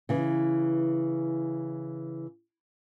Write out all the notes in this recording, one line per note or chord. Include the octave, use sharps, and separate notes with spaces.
C#3 E3